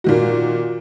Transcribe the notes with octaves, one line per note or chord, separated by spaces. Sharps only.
A#2 D#3 F#4